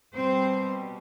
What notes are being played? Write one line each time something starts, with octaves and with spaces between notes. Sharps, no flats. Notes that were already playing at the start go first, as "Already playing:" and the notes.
B2 G3 C4 C5